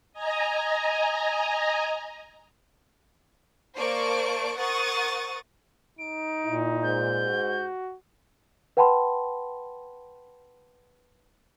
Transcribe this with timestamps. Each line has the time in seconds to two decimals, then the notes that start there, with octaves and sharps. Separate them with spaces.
0.13 D#5 G#5 A#5
3.76 A#3 C5 D5 A5 C#6 D7
4.58 A#4 C5 F#5 C#6 D#6 A6
5.99 D#4 D7
6.45 A#2 E4
6.83 G#2 G6
7.27 F#4
8.77 B4 F#5 G5 A5 B5 C6